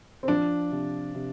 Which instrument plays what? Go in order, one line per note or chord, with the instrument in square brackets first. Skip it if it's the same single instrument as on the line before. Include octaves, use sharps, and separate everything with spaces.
[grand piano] C4
[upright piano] F3 [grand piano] D4
[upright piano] C3
C3